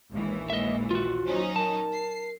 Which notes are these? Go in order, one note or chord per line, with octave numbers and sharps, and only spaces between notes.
A#1 D#2 E3 G#3
G#3 D#5 E5
F4 F#4
F#3 C#4 D#4 C5
A#4 A5
C7